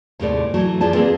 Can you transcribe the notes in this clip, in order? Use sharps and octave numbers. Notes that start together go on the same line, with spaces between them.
D#2 A2 C3 G#3 A3 D5
E3 F#3 A3
F2 F3 G#4 D5 A5
A#3 C4 G#4 A4 B4